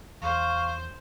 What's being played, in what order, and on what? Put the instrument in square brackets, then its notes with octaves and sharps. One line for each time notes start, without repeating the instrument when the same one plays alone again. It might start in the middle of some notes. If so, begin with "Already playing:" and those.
[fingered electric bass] E2 [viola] C5 [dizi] F5 [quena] C#6